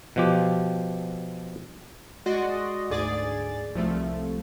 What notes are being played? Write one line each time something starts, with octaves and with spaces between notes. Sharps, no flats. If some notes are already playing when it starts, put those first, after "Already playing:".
B2 F3 G4
G#3 F#4 D5 D#5 C6 A#6
D2 G#2 G#4 D5 A6
C2 F3 A3